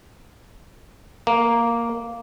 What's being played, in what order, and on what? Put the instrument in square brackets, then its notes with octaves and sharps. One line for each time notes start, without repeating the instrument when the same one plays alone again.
[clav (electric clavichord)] A#3